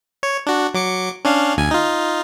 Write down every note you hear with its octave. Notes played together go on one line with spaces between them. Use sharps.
C#5
D4 F#4
F#3 D6 C#7
C#4 D4 F5
D2 G#5
D#4 F4